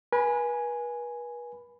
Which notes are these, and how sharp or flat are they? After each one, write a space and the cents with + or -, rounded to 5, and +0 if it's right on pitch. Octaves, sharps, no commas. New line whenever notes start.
B4 -40 G#5 +0 B5 +10